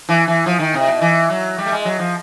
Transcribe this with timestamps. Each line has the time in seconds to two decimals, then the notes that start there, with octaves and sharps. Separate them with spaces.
0.09 E3
0.28 E3
0.46 F3
0.59 D#3
0.74 C3
0.89 B2
1.01 E3
1.30 F#3
1.58 G3
1.66 A3
1.72 G#3
1.85 F#3
1.99 F3